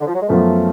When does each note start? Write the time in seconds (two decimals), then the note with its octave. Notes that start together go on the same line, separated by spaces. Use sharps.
0.01 D3
0.07 F3
0.15 F#3
0.22 G#3
0.29 F#2 F3 A3 B3 F4